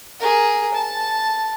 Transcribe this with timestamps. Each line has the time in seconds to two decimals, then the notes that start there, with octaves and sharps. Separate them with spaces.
0.20 G#4 A#4
0.74 A5